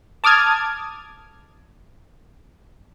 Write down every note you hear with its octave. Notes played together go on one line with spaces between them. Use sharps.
A5 D6 D#6 F6 G#6